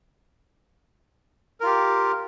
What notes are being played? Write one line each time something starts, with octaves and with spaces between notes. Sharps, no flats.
F4 G4 A#4